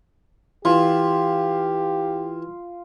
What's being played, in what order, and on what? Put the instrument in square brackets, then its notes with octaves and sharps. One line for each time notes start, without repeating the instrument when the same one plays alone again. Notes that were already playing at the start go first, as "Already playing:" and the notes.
[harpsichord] E3 [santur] F4 [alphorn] G4